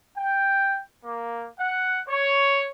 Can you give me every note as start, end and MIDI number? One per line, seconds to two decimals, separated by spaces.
0.16 0.81 79
1.05 1.48 58
1.59 1.98 78
2.07 2.71 73